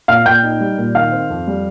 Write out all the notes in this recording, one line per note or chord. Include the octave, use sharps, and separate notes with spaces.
A#2 F5 F6
A#2 G5 G6
D#4
G3
A#2
D#3 F5 F6
C4
F2
G3